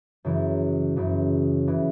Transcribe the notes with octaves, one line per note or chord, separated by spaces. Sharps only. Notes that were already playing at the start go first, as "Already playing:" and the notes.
F#2 C#3 E3
F#2 C#3 E3
C#3 E3